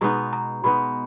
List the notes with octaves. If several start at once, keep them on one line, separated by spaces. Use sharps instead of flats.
B2 G#3 B3 D#4 A#5
A#5
B2 G#3 B3 D#4 B5